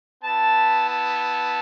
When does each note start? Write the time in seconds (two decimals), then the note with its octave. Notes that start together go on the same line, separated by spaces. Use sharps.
0.24 B3 E4 A5
0.89 A5